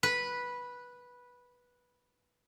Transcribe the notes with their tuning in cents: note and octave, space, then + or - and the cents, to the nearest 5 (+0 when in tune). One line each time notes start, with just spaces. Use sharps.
B4 -10